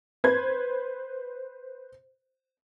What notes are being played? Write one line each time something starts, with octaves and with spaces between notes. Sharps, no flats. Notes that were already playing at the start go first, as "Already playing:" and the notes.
B4 C5 G#6